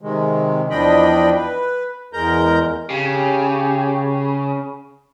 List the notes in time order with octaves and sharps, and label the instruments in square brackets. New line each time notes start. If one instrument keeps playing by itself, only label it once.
[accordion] C3 D#3 G#3
E2 F3 D4 D#5 G5 B5
B4
E2 G#3 A#4 A#5 G6
[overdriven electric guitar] C#3 [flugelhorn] G4